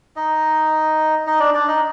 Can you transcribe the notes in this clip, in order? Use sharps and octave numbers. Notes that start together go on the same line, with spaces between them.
D#4 D#5
D#4 D#5
D4 D5
D4 D5
D#4 D#5